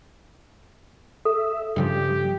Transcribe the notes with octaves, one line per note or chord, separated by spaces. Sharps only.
A4 E5
G2 C#3 F3 G3 G4